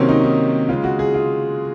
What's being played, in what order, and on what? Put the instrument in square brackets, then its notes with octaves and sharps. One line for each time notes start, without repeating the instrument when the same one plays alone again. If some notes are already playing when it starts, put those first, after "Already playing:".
Already playing: [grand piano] C3 D#3 F#3 A#3 C4 C#4
D#4
D#4
C#3 G#3 F4
F#4
G#4
F4